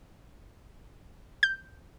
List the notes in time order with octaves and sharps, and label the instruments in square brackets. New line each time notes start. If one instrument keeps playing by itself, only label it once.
[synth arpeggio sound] G6